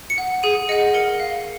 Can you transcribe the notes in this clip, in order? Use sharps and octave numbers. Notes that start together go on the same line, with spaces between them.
C#7
F#5
G#4 D#7
D#5 F#5 C#7
A#4 C#7
F5